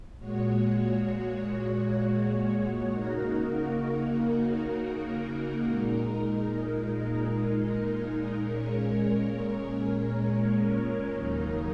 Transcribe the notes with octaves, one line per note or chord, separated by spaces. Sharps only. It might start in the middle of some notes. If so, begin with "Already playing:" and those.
A#2 G#3 F#4 C#5
C#3 A#3 D#4 F#4 A#4
A#2 G#3 D#4 A#4
A#2 G#3 C#4 A#4 C#5
D#2 C#3 F#3 D#4 A#4